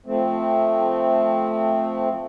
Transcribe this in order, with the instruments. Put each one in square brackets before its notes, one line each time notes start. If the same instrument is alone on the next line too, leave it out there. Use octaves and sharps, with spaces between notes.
[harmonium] F3 A3 C4